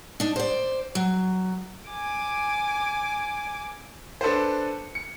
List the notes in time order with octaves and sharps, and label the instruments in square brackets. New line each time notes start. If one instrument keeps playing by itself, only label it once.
[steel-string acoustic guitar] D4 D#4
C5 D5
F#3
[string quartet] G#5 D6
[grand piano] D4 A4 B4 C5
C#7